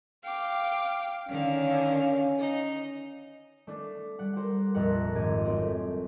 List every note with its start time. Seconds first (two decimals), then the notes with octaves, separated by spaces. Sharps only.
0.24 F5 G5 D6
1.28 D3 D#3 C#4 F5
2.39 D#4
3.67 A3 D4
4.19 G3 F#5
4.36 G4 A#4 C5 F#5
4.74 F1 A#1 F2 A#4 F#5
5.15 G#1 G4 G#6 D#7
5.45 F#2 A3 C4